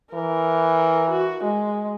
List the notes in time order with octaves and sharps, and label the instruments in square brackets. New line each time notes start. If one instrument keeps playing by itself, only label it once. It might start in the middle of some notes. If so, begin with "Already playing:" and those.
[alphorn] E3 [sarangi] A#4
[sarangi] F#4
G#3